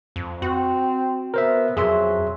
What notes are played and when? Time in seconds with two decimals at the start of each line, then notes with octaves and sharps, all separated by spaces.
0.16 F2
0.42 C4 F#4
1.34 B3 A#4 C5 E5
1.77 F2 F#3 G#4 E5 C6